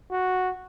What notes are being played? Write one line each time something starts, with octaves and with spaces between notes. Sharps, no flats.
F#4